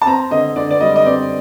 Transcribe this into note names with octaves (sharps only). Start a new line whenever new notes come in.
A5
C4 A#5
D3 D#5
D3 D5
D5
G3 D#5
D#5
C4 D5